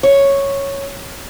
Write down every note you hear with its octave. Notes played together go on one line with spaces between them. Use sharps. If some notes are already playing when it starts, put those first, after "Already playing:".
C#5